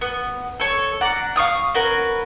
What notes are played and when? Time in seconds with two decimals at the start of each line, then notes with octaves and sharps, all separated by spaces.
0.01 B3
0.60 A4 C#5
1.01 D4 F#5 A#5 D6
1.36 F5 C#6 D#6 F6
1.75 C#4 F#4 A#4 B4